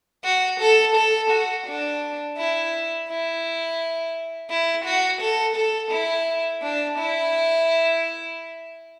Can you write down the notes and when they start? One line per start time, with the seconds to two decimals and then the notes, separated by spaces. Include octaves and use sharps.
0.24 F#4
0.60 A4
0.96 A4
1.30 F#4
1.67 D4
2.37 E4
3.09 E4
4.50 E4
4.85 F#4
5.21 A4
5.56 A4
5.91 E4
6.62 D4
6.98 E4